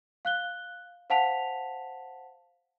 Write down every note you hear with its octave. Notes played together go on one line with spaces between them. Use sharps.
F5 F#6 G7
C5 F5 F#5 A5 B6 F7